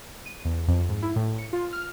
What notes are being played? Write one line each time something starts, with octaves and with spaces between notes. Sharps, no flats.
D#7
E2
F2
G#2
E4
A2
C#7
F4
F6